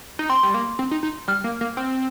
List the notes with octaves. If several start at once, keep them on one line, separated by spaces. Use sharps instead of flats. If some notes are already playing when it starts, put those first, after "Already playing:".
D#4
C4 C6
G3
A#3
C4
D#4
D#4
G3 F6
A#3
A#3
C4